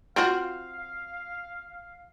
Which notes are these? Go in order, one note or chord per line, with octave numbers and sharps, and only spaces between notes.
C4 F4 F#4 F5